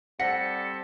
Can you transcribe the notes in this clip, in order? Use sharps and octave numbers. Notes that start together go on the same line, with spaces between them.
G3 C4 A4 F#5 A#6 B6 C#7